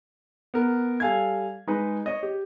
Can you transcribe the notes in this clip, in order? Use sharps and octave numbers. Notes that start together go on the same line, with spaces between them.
B3 A#4
G3 A4 F5 G#5 G#6
G#3 D#4 B4
C#5 D#5
G4